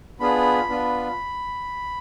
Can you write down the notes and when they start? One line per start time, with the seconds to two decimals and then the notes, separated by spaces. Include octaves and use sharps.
0.20 B3 D4 F4 G#4 B5
0.69 B3 D4 F4